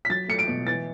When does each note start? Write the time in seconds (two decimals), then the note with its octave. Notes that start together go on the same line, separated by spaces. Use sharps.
0.05 B6
0.10 F#3 A6
0.28 A3 C#7
0.39 D7
0.48 B2
0.67 E3 A6